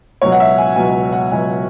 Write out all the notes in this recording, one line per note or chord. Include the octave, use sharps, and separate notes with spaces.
C#2 B2 F#3 C#5
F#5
E5
G#5
C#2 B2 F#3 G#5
F#5
C#2 B2 F#3 G#5